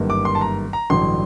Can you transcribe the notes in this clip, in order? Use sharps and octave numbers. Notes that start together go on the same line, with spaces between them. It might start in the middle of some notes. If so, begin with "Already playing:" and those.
Already playing: G1 F#2 D#3 G3 A#3
D6
C6
A5
A#5
A#5
A1 G2 D3 F#3 C6